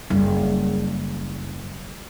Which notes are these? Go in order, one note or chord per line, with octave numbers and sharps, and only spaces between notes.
F#1 G3